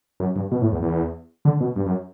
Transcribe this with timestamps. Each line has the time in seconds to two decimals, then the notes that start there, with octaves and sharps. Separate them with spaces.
0.20 F#2
0.36 G2
0.52 B2
0.62 A2
0.72 E2
0.83 E2
1.45 D3
1.60 B2
1.76 G2
1.86 F#2